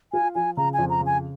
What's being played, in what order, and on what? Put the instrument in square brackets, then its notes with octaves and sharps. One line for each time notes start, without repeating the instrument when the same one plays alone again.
[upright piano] F4 [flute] G#5
[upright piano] F3 [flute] G#5
[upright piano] C#3 [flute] A#5
[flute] G#5
[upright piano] F2
[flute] A#5
[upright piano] C#3
[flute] G#5